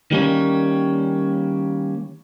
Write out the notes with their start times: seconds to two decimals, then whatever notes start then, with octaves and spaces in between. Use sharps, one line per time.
0.11 D#3 G3 A#3 C#4